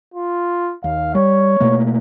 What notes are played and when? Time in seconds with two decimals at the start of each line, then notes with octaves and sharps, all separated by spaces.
0.14 F4
0.84 D#2 F5
1.15 G3 C#5
1.60 B2 A3 A#3